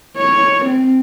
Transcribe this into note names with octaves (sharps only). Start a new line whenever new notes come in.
C#5
C4